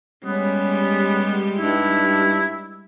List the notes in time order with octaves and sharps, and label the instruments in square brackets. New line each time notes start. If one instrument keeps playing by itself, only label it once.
[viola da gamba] G3 G#3 G4 [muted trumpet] B3 [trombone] C#4
[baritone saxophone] G2 [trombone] D#4 [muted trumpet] E4